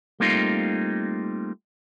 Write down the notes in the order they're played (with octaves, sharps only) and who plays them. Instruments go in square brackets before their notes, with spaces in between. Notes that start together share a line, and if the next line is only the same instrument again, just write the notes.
[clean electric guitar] G3 A3 A#3 C4 D#4 F4